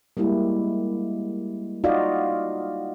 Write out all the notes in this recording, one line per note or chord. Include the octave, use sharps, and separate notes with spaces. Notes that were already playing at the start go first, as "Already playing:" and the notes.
G3 G#3 A#3 E4 G4
D#4 F4 F#4 D5 D#5 F5